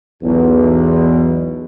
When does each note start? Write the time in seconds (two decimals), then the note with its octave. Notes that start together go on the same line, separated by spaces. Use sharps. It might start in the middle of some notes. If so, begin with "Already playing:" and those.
0.23 B1 E2